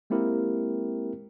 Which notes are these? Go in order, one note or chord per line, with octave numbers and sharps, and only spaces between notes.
G#3 A#3 C4 E4 G4 A#4